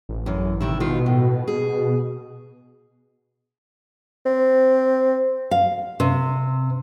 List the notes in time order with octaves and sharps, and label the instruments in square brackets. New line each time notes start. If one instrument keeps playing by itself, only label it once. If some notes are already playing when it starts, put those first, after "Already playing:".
[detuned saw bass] A1
[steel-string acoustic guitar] F#2 E3
C3 D#3 E4
[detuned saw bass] B2 [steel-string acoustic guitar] D#3 F4
[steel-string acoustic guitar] A2
G#4
[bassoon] C4
[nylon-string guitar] F5
C3